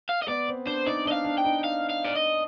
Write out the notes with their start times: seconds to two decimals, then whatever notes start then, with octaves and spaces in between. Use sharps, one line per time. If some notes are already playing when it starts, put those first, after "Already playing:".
0.09 F5
0.22 D#5
0.28 B3 D5
0.48 C4
0.66 D4 C5
0.86 D#4 D5
1.06 D4 D#5
1.12 F5
1.25 D4
1.38 G5
1.45 D#4
1.64 F5
1.90 F5
2.05 D5
2.15 D#5